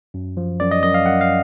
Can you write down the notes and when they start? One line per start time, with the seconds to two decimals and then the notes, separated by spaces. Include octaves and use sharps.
0.14 F#2
0.37 F3
0.60 F#2 D5
0.71 D#5
0.83 F#2 D#5
0.94 F5
1.06 F#2 F#5
1.21 F5